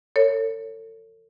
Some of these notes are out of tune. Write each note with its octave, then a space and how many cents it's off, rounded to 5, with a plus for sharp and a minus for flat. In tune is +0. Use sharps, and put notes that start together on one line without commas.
A4 +40 C#5 +0